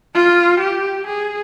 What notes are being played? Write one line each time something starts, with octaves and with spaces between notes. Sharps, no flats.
F4
G4
G#4